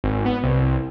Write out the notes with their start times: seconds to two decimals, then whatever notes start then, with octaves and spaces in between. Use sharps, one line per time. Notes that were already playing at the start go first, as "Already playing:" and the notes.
0.04 G#1
0.26 B3
0.43 C2